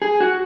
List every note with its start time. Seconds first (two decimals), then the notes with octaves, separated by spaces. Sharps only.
0.02 G#4
0.20 F#4